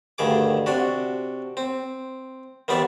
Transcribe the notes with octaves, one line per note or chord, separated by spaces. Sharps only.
D2 G2 D#3 G#4 D6
C3 D4 F#4
C4
D#3 E3 G3 B3 C5 D5